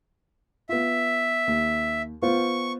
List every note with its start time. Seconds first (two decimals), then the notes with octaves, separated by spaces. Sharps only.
0.69 B3 F4 E5
1.47 D#2
2.22 B3 F4 C5 C#6